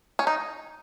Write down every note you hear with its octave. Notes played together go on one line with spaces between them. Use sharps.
C#4
D#4